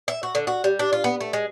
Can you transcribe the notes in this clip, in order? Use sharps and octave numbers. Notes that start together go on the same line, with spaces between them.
E5
F#4
D3
F#4
G3
D4
F4
B3
A3
G#3